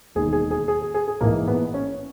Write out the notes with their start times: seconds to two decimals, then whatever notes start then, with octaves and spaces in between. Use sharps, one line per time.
0.15 E1 D#2 D#3 G#4
0.33 G#4
0.51 G#4
0.68 G#4
0.82 G#4
0.94 G#4
1.08 G#4
1.21 A#1 G#2 E3 A#3
1.48 B3
1.74 C#4